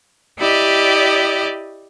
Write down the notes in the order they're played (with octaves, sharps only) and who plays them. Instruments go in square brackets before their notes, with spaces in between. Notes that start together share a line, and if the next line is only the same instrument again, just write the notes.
[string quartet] E4 G4 D5 D#5